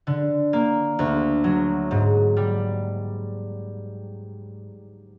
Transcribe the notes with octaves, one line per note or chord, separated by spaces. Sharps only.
D3
A#3
D2
F#3
G#2
G3